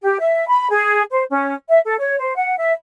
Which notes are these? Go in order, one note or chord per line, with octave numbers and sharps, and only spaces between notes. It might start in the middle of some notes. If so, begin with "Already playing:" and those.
G4
E5
B5
G#4
C5
C#4
E5
A4
C#5
C5
F#5
E5